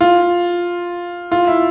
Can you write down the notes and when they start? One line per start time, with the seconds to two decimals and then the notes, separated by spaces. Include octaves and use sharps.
0.01 F4
1.32 F4
1.47 E4